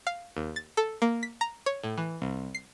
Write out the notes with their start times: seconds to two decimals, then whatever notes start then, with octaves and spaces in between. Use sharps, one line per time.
0.07 F5
0.37 D#2
0.56 A6
0.77 A4
1.02 A#3
1.23 B6
1.41 A#5
1.66 C#5
1.83 A2
1.98 E3
2.22 C2
2.55 C7